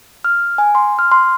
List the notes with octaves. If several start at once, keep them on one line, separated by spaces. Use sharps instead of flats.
F6
G#5
C6
F6
C6